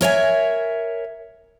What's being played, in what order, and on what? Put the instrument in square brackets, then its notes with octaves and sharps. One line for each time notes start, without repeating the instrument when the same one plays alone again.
[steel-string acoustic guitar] A#4 C#5 E5 G#5